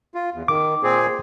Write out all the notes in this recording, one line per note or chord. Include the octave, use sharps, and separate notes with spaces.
F4
E2
D#3 D6
A#2 C4 G#4